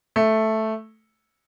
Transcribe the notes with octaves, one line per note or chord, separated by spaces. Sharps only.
A3